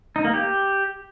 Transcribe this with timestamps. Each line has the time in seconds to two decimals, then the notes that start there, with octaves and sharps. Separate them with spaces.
0.16 D#4
0.25 A#3
0.33 G4